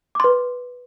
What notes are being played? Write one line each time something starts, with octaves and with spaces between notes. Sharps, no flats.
B4 C6 D6